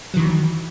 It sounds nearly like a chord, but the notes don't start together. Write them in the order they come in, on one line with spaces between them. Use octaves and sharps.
F#3 D#3 E3